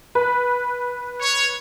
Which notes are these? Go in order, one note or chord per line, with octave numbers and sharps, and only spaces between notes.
B4
C#5